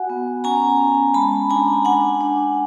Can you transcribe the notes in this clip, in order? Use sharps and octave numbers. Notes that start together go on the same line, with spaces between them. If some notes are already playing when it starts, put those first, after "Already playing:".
Already playing: F#4 F#5 G#5
B3
C#4 G#5 A#5
C#4
G#3 A5 B5
D4 G#5 A#5
D4 F#5 G#5
D4